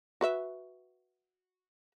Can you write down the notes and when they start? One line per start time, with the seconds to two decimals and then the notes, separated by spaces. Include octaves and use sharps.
0.21 F#4 B4 E5